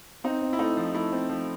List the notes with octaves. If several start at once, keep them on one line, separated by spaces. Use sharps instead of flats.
C4 D#4
C4
E4
A3 D#4
F3
A3 E4
C4
F3